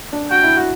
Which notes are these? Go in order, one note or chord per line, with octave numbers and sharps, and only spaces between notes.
D4
F#4 G5
E4
F#4